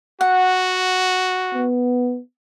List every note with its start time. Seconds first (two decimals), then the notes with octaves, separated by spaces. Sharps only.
0.21 F#4 F#5
1.55 B3